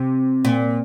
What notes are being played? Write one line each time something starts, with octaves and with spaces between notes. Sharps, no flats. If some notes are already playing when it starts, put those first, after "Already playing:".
Already playing: C3
A#2